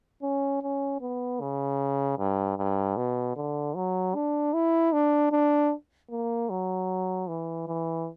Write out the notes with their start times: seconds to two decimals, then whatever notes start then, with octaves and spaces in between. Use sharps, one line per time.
0.22 C#4
0.62 C#4
1.01 B3
1.41 C#3
2.18 G2
2.58 G2
2.97 B2
3.36 D3
3.75 F#3
4.15 D4
4.53 E4
4.93 D4
5.32 D4
6.10 A#3
6.50 F#3
7.28 E3
7.67 E3